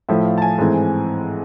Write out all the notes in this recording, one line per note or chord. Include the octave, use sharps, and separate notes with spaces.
A2 F3 A3 E5
F5
A5
G#5
G#2 E3 A3 C4